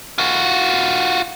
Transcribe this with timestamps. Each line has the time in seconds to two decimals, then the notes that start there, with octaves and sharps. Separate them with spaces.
0.18 F4 F#4